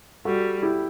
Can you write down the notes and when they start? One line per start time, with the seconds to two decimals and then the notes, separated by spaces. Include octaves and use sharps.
0.25 G3 F#4 A4
0.62 E4 G4